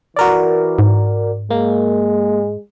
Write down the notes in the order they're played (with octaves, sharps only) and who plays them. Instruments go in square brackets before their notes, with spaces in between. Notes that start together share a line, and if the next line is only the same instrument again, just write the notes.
[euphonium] E3 [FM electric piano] F#4 A#4 D5
[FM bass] G#2
[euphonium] G#3 [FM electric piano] A#3